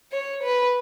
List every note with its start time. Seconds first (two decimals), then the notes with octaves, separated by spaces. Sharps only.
0.12 C#5
0.43 B4